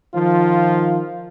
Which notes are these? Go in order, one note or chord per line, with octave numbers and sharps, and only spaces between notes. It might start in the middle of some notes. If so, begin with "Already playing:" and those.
D#3 F3 F4